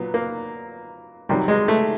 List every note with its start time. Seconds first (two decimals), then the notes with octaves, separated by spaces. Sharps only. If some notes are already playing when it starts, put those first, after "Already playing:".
Already playing: A#2 F#3 B3
0.14 A#3
1.29 C3 D#3 F#3 G3
1.48 G#3
1.68 A3